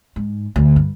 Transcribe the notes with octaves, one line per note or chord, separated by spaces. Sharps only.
G#2
D2
G2